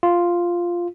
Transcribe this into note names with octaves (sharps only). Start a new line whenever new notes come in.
F4